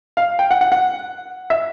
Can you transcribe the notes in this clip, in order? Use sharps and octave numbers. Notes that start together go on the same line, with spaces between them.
F5
G5
F#5
F#5
F#5
E5